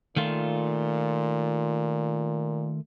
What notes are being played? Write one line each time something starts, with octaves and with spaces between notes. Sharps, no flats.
A#2 D#3 A3 F4